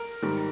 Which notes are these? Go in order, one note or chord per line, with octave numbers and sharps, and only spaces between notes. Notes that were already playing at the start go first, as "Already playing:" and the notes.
Already playing: A#4
G#2 D#3 G3